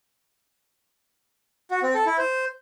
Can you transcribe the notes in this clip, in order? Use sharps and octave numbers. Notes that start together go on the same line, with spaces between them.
F#4
C4
A4
E4
C5